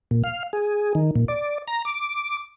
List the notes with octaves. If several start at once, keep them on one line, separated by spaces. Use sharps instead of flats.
A#2
F5
G#4
D#3
A#2
D5
A#5
D6